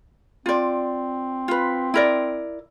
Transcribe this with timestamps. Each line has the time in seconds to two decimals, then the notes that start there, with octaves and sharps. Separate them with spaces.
0.46 C4 F4 D5
1.48 F4 B4
1.94 E4 A#4 D5